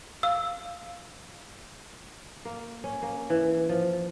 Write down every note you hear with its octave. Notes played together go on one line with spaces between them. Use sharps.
F5 E6
A#3
C#4
A#3
E3
F3